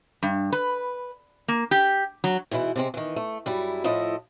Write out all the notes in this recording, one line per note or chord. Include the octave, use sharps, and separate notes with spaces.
G2
B4
A#3
G4
F#3
G#2 B2 E3 E4 F#5
C3 G#3 C4
D#3 E3
A3
F#2 G3 E4
A2 F3 E4 A4 D#5